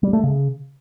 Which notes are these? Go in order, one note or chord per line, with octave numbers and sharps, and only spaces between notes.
G3
A3
C#3